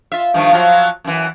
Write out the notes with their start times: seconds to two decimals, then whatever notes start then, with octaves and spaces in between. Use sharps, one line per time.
0.12 F4 E5
0.34 G2 D#3 F3
0.53 F3 F#3 F4
1.04 F#2 E3